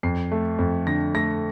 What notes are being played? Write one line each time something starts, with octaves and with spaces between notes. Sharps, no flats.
F2 C7
A3
F2
D3 A#6
A3 A#6